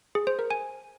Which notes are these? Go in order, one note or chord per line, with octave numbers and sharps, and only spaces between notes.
G#4
C5
A#4
G#5